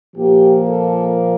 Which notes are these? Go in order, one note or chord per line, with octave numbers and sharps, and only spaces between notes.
A#2 F3 A#3 G4
A4